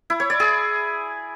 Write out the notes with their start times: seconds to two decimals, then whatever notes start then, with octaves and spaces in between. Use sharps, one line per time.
0.10 E4
0.20 C#5
0.30 D5
0.40 G#4